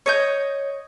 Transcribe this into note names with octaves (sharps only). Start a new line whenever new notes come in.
C#5 D#5 G6